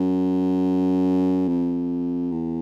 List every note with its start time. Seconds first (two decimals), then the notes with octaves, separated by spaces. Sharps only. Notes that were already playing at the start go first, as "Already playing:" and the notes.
Already playing: F#2
1.48 F2
2.32 E2